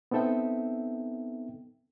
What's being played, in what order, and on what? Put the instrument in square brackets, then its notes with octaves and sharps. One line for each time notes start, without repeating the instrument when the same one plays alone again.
[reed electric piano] B3 C4 D#4 A4 E5 G5